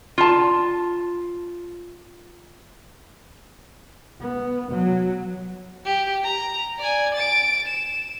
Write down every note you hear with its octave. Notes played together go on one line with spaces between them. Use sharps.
F4 A5
B3
F#3
G4
A#5
D5 G#5
A6 D7
E7